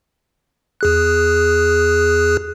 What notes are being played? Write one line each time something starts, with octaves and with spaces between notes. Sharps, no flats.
E2 G#4 F#6